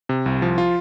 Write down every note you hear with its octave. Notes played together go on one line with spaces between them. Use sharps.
C3
C2
F3
F4